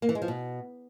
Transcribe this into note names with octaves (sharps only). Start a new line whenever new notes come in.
A#3
E3
G#3
F3
B2